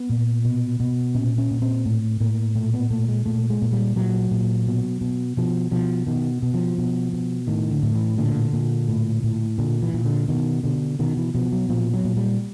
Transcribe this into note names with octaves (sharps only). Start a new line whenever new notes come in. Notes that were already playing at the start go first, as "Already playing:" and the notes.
Already playing: B3
A#2
B2
B2
A#2 C#4
C#4
A#2
C4
A2
A2 A#3
A#2 A3
B3
A#2 A3
G#3
A#2 A3
G#3
A#2
G3
A#2 F#3
A#2
B2
B2
B2 F3
B2 F3
B2 D#3
B2
F3
B2
B2
A2 D#3
D3
A2
E3
A#2 D3
A#2
A2
A2
A#2 D3
E3
A#2
D3
B2 D#3
B2 D3
B2 D#3
E3
B2 F3
F#3
A#2 F3
F#3
A#2
G3